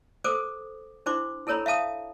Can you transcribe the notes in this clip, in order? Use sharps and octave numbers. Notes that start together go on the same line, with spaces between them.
A4 A#4 C5 D6 D#6
D4 E4 C5 C6 D6
E4 A4 A#4 C#5 A#5 B5
E5 F5 A5 D#6